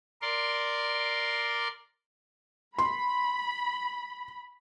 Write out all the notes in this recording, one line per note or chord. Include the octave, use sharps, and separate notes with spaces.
A#4 D5 C6
B5 C6